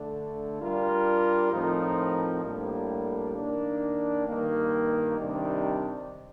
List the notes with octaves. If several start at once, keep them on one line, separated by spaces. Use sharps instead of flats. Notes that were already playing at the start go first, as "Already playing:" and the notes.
Already playing: D3 A3 D4
G3 D4 F4 A#4
A2 F3 C4 D#4 A#4
A2 G3 A#3 D4
D#3 A#3 D4
G2 D#3 A#3
C3 D#3 G3 D4